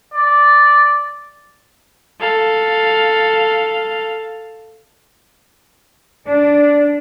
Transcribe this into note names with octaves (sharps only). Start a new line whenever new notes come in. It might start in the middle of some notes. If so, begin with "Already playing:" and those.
D5
A4 F5
D4